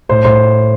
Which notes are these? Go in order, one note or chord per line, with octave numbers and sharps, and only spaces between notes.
A2 C5
A2 C5